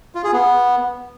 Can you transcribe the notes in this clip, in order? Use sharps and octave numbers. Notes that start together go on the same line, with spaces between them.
F4
G#4
B3